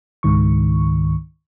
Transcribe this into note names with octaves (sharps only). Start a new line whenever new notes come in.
C#2 G#2 D#3 C#6